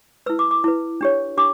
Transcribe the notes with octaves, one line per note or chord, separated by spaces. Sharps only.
E4 B4 E6
D6
D6
E4 B4
D4 G4 C#5
D4 G4 D6